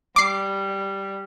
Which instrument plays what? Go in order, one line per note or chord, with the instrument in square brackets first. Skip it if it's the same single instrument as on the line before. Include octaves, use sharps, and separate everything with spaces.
[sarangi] G3 [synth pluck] D6 C7